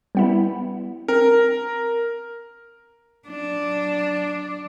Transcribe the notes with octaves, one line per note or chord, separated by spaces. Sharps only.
G3 B3 E4
C4 A#4
F#3 D4